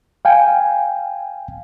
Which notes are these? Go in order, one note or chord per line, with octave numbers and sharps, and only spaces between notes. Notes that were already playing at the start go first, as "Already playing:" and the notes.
F5 G5 G#5